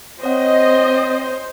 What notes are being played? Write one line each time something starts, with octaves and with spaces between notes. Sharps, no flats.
C4 C5 C#5 D#5 F#5